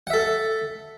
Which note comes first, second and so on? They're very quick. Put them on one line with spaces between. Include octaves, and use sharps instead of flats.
F#5 E5 A4